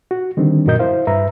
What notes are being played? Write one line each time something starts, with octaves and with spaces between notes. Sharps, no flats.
F#4
D3 D#3 G3 C4 D4
F#2 A#2 F#4 A#4 D#5 G6
E4 C5 F5
G2 B4 E5 A#5